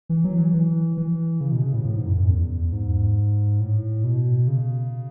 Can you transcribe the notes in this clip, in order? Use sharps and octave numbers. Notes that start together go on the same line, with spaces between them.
E3
F#3
E3
E3
E3
C#3
B2
C#3
A2
A2
G#2
F#2
F#2
E2
G#2
A2
B2
C#3